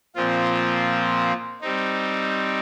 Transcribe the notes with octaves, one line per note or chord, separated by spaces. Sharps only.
A#2 F3 C4 F4
G3 C4 D#4